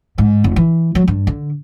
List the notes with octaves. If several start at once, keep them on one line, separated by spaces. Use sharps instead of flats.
G#2
F1
E3
F#3
G2
D3